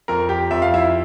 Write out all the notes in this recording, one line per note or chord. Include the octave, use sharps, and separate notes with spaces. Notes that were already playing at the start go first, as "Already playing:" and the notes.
F2 A#4 A#5
G4 G5
F2 E5
F5
E4 E5